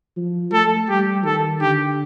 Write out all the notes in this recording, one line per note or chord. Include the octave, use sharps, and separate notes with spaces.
F3
A3 A4
G3 G4
D#3 A4
D3 G4